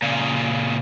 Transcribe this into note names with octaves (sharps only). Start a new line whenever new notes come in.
A#2 C#3